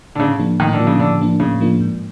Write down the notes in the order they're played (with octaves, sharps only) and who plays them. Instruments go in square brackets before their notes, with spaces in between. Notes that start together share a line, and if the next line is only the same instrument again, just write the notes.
[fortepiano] D3
[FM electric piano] A2 [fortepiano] C#3
[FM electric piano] F3 A#3 D4
[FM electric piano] A2 [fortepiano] D#3
[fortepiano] D3
[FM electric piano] F3 A#3 D4
[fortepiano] C#3
[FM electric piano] A2 [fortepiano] D3
[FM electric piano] F3 A#3 D4
[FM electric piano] A2 [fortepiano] C#3
[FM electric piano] F3 A#3 D4
G#2